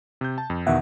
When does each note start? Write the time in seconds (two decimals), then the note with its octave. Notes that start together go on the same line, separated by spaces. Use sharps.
0.21 C3 G6
0.38 A5
0.50 F2
0.67 E2 B2 D#3 E5 F#5